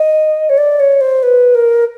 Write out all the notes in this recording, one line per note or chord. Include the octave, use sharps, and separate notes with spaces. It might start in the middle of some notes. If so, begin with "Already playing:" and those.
Already playing: D#5
C#5
D5
C#5
C5
B4
A#4